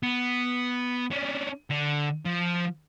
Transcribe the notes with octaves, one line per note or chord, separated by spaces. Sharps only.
B3
C#4 D4
D3
F3